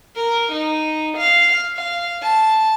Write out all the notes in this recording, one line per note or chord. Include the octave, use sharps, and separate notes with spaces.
A#4
D#4
F5
F5
A5